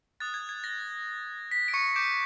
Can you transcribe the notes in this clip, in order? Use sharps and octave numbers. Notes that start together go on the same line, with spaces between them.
D#6 F#6 A6
G#6
G#6
A#6
B6
D7
C#6 C#7
D6 G6 D7